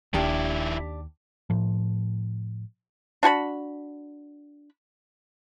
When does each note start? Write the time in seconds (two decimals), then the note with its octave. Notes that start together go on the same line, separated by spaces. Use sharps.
0.14 D#1 D#2 D#3 D4 E4 G4
1.50 A2 F3
3.23 D4 F#4 G#5 B5